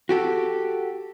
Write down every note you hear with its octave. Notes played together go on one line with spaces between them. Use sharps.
F#4 G4 A4